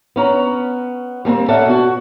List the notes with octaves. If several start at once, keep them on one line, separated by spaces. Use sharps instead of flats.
B3 C#4 A#5
G3 A3 A#3 C4
C#4 A4 D5 E5 F#5
B2 F#4